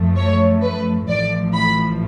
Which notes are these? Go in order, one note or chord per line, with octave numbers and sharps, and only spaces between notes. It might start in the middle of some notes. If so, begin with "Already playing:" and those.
Already playing: F#2 F3 A3
C#5
B4
A1 A2 F3 D5
B5